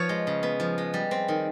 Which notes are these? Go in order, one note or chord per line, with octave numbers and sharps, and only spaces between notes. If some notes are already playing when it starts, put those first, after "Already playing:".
Already playing: F3 B3 C#5
G#3
C#3
B3
F3
G#3
G3
C4
D#3